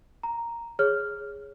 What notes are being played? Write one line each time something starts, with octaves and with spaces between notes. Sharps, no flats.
A#5
G#4 C#5 F6